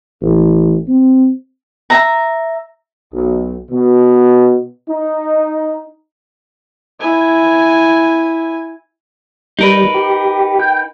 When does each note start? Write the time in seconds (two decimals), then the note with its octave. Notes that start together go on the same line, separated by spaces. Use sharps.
0.22 A1
0.88 C4
1.90 E5 A#5
3.12 B1
3.71 B2
4.87 D#4
7.00 E4 G#5
9.59 G3 D#4 A#4 B4
9.94 G4
10.60 G5